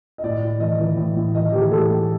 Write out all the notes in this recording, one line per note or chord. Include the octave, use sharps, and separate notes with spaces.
D#5
A2 D5
A2
E3 D#5
E3
A2
A2
E3 D#5
E3 G4
G#4
A2 A4
A2